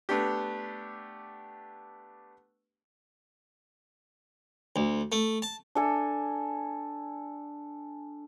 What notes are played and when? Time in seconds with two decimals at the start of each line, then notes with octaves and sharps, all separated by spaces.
0.09 A3 B3 D4 G4
4.76 D2
5.12 A3
5.42 A5
5.75 D4 A4 G#5